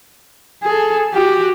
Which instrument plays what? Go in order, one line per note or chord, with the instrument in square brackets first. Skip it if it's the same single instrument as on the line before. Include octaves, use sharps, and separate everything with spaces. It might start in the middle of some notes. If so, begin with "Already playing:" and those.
[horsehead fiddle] G#4 A4
F#4 G4